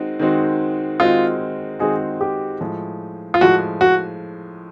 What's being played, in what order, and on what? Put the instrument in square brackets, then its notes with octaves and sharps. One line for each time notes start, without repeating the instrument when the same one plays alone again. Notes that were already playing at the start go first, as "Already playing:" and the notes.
Already playing: [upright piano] D#3 G#3 C4 D#4 F#4
D#3 G#3 C4 D#4 F#4
[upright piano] D#3 G#3 C4 D#4 F#4 [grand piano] F4
[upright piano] D#3 G#3 C4 D#4 F#4 [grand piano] G#4
[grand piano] G4
[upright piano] A2 F3 G#3
[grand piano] F4
[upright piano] A2 F3 G#3 [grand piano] F#4
[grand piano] F#4